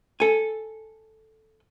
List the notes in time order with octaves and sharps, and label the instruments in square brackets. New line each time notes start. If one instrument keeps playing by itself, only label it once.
[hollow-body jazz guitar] A4 G#5